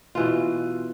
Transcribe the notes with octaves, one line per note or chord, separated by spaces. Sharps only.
B2 E3 F4